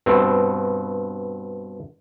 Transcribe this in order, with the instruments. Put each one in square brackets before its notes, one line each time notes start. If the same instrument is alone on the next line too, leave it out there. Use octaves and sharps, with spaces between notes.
[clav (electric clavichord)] G2 B2 C4